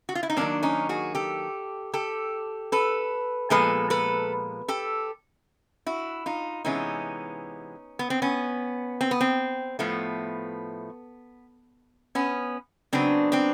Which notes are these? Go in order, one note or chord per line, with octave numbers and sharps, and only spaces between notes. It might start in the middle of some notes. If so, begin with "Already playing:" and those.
F#4
F4
E4
D#4
D#3 F#3 A#3 C4 D4
C#4 D#4
F#4 G#4
G4 A4
G4 A4
A4 B4
A#2 F3 G#3 B3 A4 B4
A4 B4
G4 A4
E4 F#4
D#4 F4
C3 E3 G#3 B3 C#4 D#4
B3
C4
B3 C#4
C4
B3
C4
A2 F3 A3 B3
B3 C#4
C#3 F#3 B3 C4 D4
C4 D4